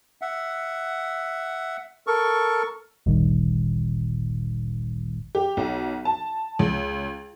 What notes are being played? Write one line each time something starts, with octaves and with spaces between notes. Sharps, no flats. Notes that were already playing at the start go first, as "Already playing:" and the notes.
E5 F#5
A4 A#4 C#6
G1 D2 A#2 D#3 G3
G4
B1
A5
C#2